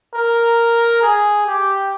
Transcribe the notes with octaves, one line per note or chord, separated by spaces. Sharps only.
A#4
G#4
G4